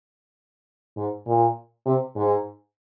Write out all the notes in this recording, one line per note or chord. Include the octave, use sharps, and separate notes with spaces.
G#2
A#2
C3
G#2